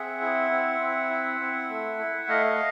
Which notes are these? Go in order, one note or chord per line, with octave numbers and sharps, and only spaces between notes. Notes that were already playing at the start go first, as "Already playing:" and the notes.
Already playing: C4 G#4 E5 F#5
E4
C4
C4
E4
C4
A3
E4
A3 D#5 F5